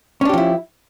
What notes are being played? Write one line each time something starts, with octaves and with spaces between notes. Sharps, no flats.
F3 C#4 D4 E4 G4